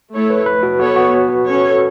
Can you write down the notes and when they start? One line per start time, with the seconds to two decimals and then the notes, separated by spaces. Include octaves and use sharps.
0.12 A3 E4 A4 C#5
0.30 B4
0.46 B4
0.63 F#4
0.79 B3 F#4 A4 C#5
0.96 F#4
1.29 F#4
1.46 C#4 A4 C#5